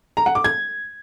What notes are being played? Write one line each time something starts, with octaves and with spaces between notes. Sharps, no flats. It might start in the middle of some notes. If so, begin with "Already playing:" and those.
A#5
F#5
D6
G#6